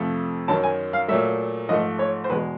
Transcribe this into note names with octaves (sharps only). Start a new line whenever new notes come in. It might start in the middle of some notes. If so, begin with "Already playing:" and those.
Already playing: F2 C3 F3 A3
F#2 D#3 F#3 A5
G#5
F5
A#2 F#3 A3 E5
G#2 F3 A3 D#5
C#5
C5
E2 B2 G#3 B4